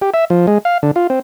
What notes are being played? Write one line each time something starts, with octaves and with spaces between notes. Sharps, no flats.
G4
E5
F3
G#3
F5
D3
F4
C4